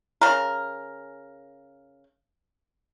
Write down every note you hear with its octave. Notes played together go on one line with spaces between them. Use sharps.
C#3 A#4